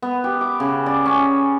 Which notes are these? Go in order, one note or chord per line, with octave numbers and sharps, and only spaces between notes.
B3
G4
D6
C#3
D5
C#4